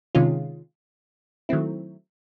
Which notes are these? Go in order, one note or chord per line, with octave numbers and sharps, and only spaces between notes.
C3 D#3 G#3 C#4 F4
D#3 F#3 A3 C4 E4